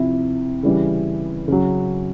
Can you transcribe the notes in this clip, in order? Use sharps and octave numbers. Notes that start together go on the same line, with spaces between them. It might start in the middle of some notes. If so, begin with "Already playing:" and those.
Already playing: C3 F3 E4
C#3 E3 G3
C#3 F#3